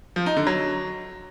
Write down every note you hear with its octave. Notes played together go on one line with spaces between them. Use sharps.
F3
D#4
D3
F#3